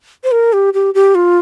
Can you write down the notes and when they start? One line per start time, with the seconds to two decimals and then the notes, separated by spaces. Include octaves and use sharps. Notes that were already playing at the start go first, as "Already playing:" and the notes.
0.24 C5
0.32 A#4
0.53 G4
0.74 G4
0.94 G4
1.15 F4